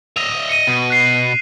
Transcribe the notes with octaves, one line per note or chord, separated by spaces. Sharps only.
D#5 E5 F7
C#7 D#7
B2
F#6 C7